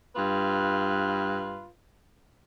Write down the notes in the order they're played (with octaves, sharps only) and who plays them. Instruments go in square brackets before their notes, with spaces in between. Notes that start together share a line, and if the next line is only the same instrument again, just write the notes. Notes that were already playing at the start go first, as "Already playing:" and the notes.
[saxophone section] G2 F4 B4